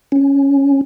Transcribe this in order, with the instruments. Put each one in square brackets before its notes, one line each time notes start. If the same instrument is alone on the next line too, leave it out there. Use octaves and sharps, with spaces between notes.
[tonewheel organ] C#4